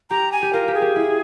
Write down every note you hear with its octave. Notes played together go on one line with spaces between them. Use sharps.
G4 A#5
G#5
G4
F4 A#4
G4
G#4
G4
E4